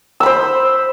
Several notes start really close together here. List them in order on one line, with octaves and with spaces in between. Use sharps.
E6 B5 C5